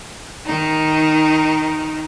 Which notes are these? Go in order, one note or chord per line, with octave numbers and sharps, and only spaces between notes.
D#3 D#4